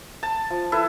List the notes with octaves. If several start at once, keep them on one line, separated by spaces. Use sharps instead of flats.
A5
F3
E4 A4 B4